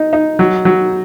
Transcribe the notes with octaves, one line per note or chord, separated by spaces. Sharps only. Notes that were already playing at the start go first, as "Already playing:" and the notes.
Already playing: D#4
D#4
F#3
F#3